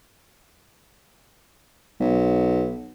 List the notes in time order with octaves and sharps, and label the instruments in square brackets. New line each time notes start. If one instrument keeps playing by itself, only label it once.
[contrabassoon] B1